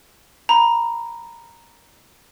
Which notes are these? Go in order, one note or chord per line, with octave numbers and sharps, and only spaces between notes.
A#5 B5